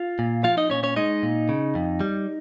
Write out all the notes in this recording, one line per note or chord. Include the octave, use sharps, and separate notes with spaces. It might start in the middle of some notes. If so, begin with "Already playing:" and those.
Already playing: F4 F5
A#2
F3 F4 F5
D#4 D#5
A#2 C#4 C#5
C#4 C#5
G#3 D#4 D#5
A#2
C#3
F2
G3